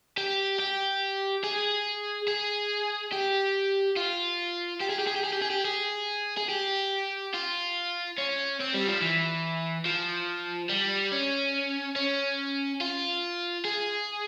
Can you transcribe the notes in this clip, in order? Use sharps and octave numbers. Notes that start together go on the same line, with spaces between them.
G4
G4
G#4
G#4
G4
F4
G4
G#4
G4
G#4
G4
G#4
G4
G#4
G4
G#4
G#4
G4
F4
C#4
C4
G3
F3
E3
F3
G3
C#4
C#4
F4
G#4